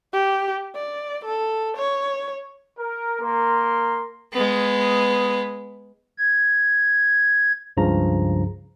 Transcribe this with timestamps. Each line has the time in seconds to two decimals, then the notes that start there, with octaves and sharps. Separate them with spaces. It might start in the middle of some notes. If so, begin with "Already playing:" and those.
0.13 G4
0.75 D5
1.25 A4
1.77 C#5
2.79 A#4
3.21 A#3 A#4 C6
4.33 G#3 B3
6.18 G#6
7.77 C#2 G2 C#3 F3 A#5